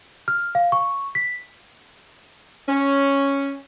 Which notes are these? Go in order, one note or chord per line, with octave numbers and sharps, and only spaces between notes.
F6
F5
C#6
B6
C#4